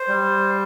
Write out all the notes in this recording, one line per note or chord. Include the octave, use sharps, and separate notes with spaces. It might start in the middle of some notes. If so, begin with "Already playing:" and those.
Already playing: C5
G3